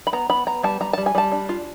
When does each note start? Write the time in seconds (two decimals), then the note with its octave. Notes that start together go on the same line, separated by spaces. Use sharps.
0.07 B5
0.13 B3 A#5
0.30 B3 B5
0.47 B3 A#5
0.63 G3 A5
0.81 G3 A#5
0.93 G3 A5
1.06 G#5
1.15 G3 A5
1.32 D4
1.49 F4